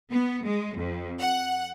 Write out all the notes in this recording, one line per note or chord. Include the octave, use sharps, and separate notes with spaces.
B3
G#3
F2
F#5